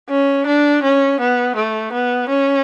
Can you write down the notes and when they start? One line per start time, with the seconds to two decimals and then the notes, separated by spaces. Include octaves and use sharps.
0.10 C#4
0.47 D4
0.83 C#4
1.20 B3
1.56 A3
1.93 B3
2.29 C#4